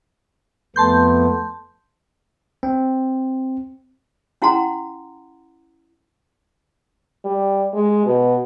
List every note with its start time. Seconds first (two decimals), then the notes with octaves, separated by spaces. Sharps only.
0.76 F2 A3 B3 A5 C6 G6
2.63 C4
4.42 C#4 E4 F5 F#5 A#5 C6
7.24 G3
7.74 G#3
8.06 B2